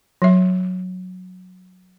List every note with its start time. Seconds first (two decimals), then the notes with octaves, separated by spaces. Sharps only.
0.22 F#3 E5